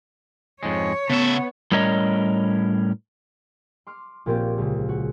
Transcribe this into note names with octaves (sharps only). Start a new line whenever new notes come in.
F2 G#2 G#3 C#5
C#3 A3 B3 E5
A2 G3 C#4 A#4 C#5 D#5
C6 D6 F6
A#1 A#2 C4 C#4 G4 D5
C#2 C#3
F#4